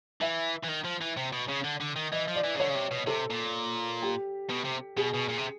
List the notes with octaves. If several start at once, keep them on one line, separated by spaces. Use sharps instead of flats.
E3 E5
E3
D#3
F3
E3
C3
B2
C#3
D3
D3
D#3
E3 D#5
F3
D5
E3
C#3
D3 C#5
C#3
C3
B2
C3 A4
A#2
G4
B2
C3
B2 G#4
B2
A#2
C3